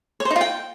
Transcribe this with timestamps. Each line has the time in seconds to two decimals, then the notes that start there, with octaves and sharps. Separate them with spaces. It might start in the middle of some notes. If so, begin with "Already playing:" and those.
0.20 C#5
0.25 C5
0.30 D#4
0.36 F4
0.41 G5